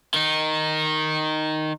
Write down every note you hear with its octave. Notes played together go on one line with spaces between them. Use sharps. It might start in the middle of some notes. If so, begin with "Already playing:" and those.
D#3 D#4